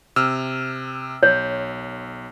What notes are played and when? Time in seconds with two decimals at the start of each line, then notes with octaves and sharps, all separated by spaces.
0.16 C3 E6 F6
1.23 B1 C#5